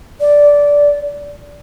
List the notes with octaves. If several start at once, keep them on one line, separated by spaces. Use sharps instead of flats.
D5